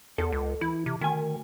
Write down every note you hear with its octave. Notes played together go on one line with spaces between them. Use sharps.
E2 A4
C#2
E3 E4
C3
D2 D#3 G#5